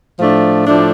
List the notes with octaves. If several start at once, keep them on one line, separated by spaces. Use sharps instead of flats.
A2 F3 A3 D4
A2 F3 A3 D4